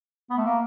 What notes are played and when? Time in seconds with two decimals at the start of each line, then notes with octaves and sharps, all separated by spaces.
0.30 B3
0.37 A3
0.45 A#3